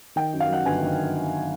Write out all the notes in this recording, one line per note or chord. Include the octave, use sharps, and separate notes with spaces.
D#3 G5
F#2
F5
F#3 F#5
G1 G#5
D#3